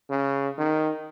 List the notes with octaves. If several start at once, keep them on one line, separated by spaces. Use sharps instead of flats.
C#3
D#3